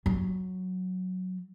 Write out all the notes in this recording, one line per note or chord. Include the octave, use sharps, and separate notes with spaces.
F#3